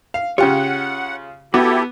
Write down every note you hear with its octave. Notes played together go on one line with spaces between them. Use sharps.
F5
C#3 F4 G4 C#5 F#5 G5
B3 E4 F#4 G4 A4 D6